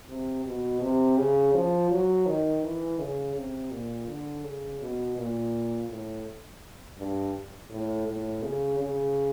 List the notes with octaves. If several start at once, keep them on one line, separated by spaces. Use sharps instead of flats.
C3
B2
C3
C#3
F3
F#3
D#3
E3
C#3
C3
A#2
D3
C#3
B2
A#2
A2
G2
A2
A2
C#3
C#3